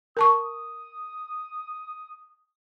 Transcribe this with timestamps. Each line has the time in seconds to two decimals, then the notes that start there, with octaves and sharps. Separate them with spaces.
0.17 A#4 A5 C#6 D#6